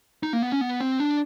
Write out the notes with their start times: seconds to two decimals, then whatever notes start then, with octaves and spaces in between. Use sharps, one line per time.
0.23 D#4
0.33 A#3
0.42 B3
0.52 C#4
0.61 B3
0.80 C4
1.00 D4